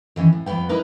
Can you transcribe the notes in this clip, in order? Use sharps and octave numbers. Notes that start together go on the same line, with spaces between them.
D#3 E3 C#4
A2
F2 F#3 B3 B4 G5
D#4 E4 A#4 B4